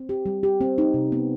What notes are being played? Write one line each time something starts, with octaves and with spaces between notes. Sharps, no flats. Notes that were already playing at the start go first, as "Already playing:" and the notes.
Already playing: C4
G4
G3
G4
C4
D#4
C3
B3